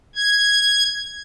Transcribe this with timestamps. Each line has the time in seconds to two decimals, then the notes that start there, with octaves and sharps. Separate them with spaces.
0.16 G#6